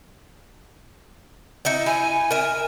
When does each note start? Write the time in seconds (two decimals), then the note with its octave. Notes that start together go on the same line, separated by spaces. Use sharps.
1.65 D#4 E4 E5
1.86 E4 G#5
2.31 A#4 E5